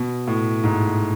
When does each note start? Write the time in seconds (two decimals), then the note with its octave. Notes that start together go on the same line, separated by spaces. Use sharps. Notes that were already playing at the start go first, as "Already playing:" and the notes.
Already playing: B2
0.27 A2
0.64 G#2